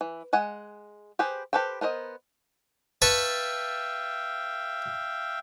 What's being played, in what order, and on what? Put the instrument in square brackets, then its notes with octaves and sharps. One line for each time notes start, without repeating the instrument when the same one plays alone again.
[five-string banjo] E3
G#3 F#5 G#5
G4 G#4 B4 C5
G4 A4 B4 C5 G5
B3 A#4 C5 D#5
[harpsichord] B4 A5 C#6 [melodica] E5 F5 G5